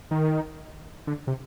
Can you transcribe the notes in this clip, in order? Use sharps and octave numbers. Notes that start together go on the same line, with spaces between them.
D#3
D3
C3